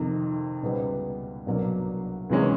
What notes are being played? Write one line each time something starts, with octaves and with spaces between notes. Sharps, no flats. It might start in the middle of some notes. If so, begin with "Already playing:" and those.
Already playing: F2 C3 D#3
C#2 B2 G3 B3
C2 B2 F#3 A#3 D4
C#2 C3 E3 G#3 C#4